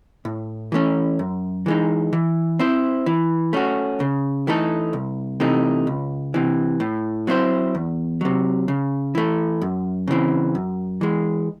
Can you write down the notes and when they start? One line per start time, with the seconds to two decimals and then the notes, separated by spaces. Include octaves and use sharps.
0.25 A2
0.72 E3 A3 C#4
1.19 F#2
1.66 E3 G#3 D#4
2.13 E3
2.59 C4 E4 C5
3.06 E3
3.53 A3 C#4 F#4
4.00 C#3
4.47 E3 A3 D#4 A4
4.93 C2
5.40 C3 E3 A3 D#4
5.87 C#2
6.34 C3 E3
6.80 A2
7.27 F#3 C4 E4 C5
7.75 E2
8.21 C3 F#3
8.68 C#3
9.15 E3 A3
9.61 F#2
10.08 C#3 E3 C4
10.55 F#2
11.01 E3 G#3